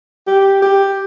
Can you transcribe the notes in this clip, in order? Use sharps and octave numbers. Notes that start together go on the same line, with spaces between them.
G4
G4